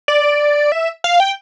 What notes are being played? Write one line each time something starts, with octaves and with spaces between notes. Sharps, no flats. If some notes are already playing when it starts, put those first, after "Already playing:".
D5
E5
F5
G5